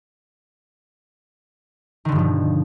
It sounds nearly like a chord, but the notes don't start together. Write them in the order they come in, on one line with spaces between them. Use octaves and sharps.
D#3 D3 G2 F3 B2